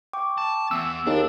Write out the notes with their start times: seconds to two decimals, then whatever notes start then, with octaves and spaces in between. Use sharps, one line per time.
0.13 G5 C#6 D6
0.38 A5
0.71 E3 B3 E6
1.06 D#2 D4 G#4